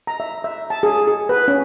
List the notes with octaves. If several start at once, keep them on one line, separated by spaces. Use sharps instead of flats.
A#5
E5
E5
A5
G#4
G#4
B4
C#4